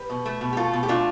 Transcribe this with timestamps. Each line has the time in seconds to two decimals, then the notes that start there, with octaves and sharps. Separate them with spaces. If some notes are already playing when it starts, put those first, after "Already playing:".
Already playing: G4 B4
0.10 B2
0.25 A3
0.41 B2
0.52 G4
0.57 A3 F4 A4
0.73 B2
0.83 G4
0.88 A3 D4 F4